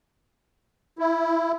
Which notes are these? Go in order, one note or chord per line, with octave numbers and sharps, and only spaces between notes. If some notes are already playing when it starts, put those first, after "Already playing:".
E4